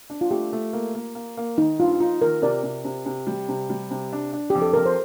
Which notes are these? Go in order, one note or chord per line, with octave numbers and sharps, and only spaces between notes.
D4
F4
A3 G4
A3
A#3
A#3
A#3
A#3
D#3 D#4
G2 F4
D#4 F4
D#3 A#4
C3 A#4 D5
C3
C3
C3
G3
C3
G3
C3
D4
D4
F2 G4
A4
F2 A#4
C5